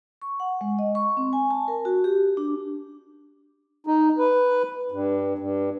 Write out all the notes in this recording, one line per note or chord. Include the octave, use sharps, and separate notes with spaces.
C#6
F#5
G#3
D#5
C#6
C4
G#5
A5
A#4
F#4
G4
D4
D#4
B4
G2
G2